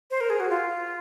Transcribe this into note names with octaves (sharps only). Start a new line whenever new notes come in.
C5
A#4
G#4
F#4
F4